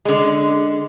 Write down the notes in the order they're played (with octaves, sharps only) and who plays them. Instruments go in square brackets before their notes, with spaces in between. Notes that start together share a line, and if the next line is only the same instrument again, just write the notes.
[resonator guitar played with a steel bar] D3 G#3